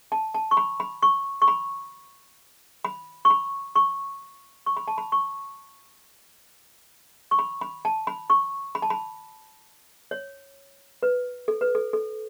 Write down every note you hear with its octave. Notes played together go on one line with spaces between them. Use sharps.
A5
A5
C#6
B5
B5
C#6
C#6
B5
B5
C#6
B5
C#6
C#6
B5
A5
B5
C#6
C#6
B5
B5
A5
B5
C#6
B5
A5
B5
C#5
B4
A4
B4
A4
A4